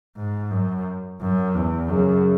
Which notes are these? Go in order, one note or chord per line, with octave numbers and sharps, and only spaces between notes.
G#2
F#2
F#2
E2
F#2 C#3